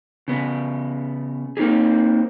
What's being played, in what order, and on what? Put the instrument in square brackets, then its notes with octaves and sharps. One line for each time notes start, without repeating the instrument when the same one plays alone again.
[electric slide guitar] C#3 B3
A#3 C4 D#4 G4 G#4